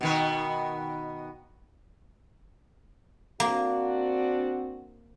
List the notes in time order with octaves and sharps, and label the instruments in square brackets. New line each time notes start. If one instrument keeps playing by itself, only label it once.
[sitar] B2 D#3 B3
[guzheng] A#3 [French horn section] C4 D4 F#4